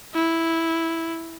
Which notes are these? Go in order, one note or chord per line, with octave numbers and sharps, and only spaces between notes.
E4